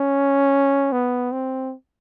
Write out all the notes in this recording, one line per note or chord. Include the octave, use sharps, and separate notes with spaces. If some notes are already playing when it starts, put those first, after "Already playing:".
Already playing: C#4
B3
C4